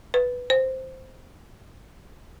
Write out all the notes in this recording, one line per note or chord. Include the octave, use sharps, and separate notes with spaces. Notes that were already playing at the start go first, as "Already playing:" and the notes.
B4
C5